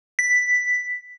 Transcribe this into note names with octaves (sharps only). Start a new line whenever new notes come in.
B6